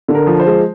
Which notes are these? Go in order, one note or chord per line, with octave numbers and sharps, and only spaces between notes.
D3
A#4
F3
C5
G#3